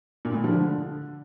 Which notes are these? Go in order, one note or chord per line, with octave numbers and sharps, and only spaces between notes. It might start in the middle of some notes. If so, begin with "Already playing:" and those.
A#2
A2
F3
D3